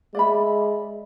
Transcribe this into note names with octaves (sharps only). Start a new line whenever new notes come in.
G#3 D5 E5 B5